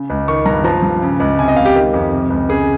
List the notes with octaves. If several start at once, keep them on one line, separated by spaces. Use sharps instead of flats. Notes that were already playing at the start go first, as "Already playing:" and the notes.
Already playing: C#3
C#2
D#3 C#6
G2 A#5
F3 A#5
G2
C#3
C#2
C3 G#5
D#5
C#2 F5
G4
D#3
F2
C3
C#2
C#3 G#4